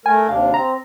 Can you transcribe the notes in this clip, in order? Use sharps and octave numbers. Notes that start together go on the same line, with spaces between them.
A3 A#4 G#5
D#2 C3 D4 F5
C4 A#5